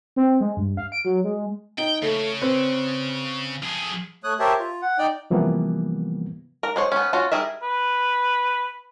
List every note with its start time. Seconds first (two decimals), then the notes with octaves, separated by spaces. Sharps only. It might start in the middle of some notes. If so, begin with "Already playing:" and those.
0.16 C4
0.41 G#3
0.57 G2
0.77 F5
0.92 D7
1.05 F#3
1.24 G#3
1.78 D#4 G5
2.02 C#3 A3
2.41 C4 B4
3.62 F3 G#4
4.24 A3 C#5 D#6 F#6
4.39 G4 A#4 C5 C#5 E5 A5
4.59 F4
4.82 F#5
4.98 D#4 D5 G5
5.30 C3 E3 F3 G3 A#3 B3
6.63 A#4
6.76 G#3 C5 C#5
6.92 B3 C#4
7.13 C#4 F4 F#4
7.32 G3 G#4 A#4 E5
7.62 B4